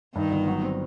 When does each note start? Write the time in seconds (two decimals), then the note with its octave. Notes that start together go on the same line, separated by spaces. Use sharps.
0.15 G2 D#3 D#4
0.32 G1
0.47 F#3
0.63 C4